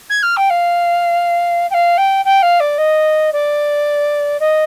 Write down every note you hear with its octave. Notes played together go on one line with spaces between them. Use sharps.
G#6
F6
G5
F5
G5
F5
G5
G5
F5
D5
D#5
D5
D#5